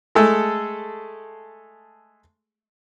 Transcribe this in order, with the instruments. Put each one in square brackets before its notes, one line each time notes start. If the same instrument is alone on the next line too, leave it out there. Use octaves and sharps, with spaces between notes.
[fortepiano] G#3 A3 G#4 A4